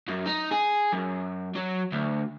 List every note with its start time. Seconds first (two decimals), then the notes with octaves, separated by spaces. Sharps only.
0.08 F#2
0.26 D#4
0.51 G#4
0.93 F#2
1.55 F#3
1.92 D2